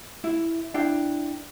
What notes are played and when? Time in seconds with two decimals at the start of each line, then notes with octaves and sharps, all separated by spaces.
0.24 E4
0.74 D4 E4 G5